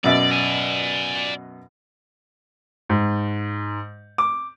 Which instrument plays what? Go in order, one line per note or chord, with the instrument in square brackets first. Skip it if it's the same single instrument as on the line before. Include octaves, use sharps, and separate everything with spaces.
[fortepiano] F#2 B2 E5 [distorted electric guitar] D5
[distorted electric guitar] D5 G#5
[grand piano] G#2
D6